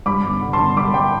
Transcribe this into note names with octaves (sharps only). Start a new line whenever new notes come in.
G2 B5 D6
G1
D3
A5 C6
G1
G2 B5 D6
G5 B5